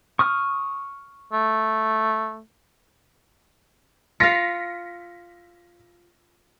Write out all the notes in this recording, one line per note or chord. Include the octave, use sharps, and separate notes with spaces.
C#6 D#6 F6
A3
F4 F5 A#6 B6 C#7